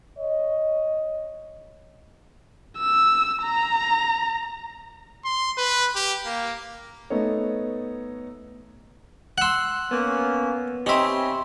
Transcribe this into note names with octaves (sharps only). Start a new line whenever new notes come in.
C#5 D#5
E6
A#5
C6
B4
G4
A#3
A3 B3 D#4 A4 C#5
F#5 C6 E6 F#6
A#3 B3 C#4
C4 D#4 G4 C#5 E5 G#5 B5